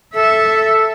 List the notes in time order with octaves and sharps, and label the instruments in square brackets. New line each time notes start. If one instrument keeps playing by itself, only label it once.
[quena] A4 [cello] E5